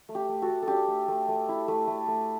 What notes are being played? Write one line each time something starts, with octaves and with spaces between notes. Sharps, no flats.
A3
G4
A3
F#4 A4
A3
A4
D4 G4
A3
A3
A3
E4
A3
A3
A3